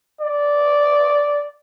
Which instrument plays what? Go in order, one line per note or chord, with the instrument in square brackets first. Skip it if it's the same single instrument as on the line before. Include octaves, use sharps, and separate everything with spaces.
[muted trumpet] D5